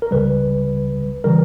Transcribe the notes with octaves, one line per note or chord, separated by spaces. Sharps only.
A#4
C#2 C#3 G3 B4
C#3 E3 G3 A#4